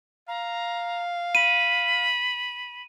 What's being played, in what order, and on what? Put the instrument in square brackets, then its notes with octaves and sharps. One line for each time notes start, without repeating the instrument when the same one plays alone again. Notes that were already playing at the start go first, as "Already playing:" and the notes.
[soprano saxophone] F5 [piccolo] A#5
[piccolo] B5 [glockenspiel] D#7